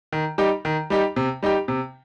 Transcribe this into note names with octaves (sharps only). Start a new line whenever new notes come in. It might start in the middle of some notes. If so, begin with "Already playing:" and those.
D#3
G3 D#4 G4
D#3
G3 D#4 G4
C3
G3 D#4 G4
C3